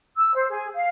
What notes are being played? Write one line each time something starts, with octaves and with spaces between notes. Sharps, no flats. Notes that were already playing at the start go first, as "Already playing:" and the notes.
E6
C5
G#4
F5